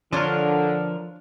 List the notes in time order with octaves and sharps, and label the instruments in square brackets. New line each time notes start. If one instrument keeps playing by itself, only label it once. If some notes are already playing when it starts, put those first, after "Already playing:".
[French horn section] D3 [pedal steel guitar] F3 A#4 [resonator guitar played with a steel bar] D4 F4 C#5